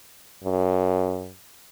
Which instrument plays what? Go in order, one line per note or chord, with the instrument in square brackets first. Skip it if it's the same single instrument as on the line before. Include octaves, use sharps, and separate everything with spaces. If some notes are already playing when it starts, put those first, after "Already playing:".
[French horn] F#2